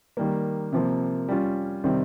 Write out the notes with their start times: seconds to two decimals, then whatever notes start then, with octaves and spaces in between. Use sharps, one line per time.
0.17 D#3 G3 A#3
0.72 C3 F3 A#3
1.28 G3 C#4 F4
1.84 C3 D#3 G3 C4